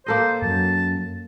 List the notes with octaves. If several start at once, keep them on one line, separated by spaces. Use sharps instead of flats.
A#3 A4 C5 D#5
F#2 A5